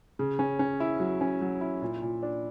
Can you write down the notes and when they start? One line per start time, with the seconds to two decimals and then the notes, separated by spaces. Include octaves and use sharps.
0.19 C#3
0.39 C#4
0.59 C#4
0.80 E4
1.00 F#3
1.21 C#4
1.41 F#3
1.61 E4
1.82 A#2
2.02 A#2
2.23 D4